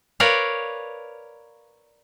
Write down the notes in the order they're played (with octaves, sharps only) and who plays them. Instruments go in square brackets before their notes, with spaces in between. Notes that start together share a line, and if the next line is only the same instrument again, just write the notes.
[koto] A#4 B4 C#5 D5 F5